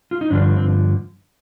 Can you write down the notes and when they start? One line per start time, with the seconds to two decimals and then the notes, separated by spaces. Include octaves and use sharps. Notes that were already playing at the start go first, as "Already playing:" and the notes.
0.11 F4
0.21 D#4
0.30 G2 D3 F3 D4
0.56 C4